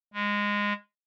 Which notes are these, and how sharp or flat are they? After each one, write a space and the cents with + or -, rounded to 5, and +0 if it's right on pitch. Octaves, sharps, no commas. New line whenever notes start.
G#3 -15